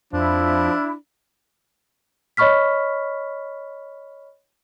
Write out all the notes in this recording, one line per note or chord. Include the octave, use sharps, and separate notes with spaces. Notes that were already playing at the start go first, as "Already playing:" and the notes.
F2 F3 D4 E4
C#5 D#5 B5 C#6 F6 B6